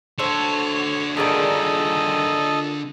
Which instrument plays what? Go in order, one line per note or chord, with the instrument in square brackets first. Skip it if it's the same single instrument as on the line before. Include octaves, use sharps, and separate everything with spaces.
[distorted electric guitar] D3 F#4 [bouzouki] A4 C5 [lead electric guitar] C#5
[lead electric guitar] G2 D#3 [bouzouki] A#2 G#4 D5 [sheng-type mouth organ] A4 D#5